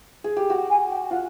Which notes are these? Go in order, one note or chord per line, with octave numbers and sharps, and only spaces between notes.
G#4
G4
F#4 G5
G#5
G5
F4 F#5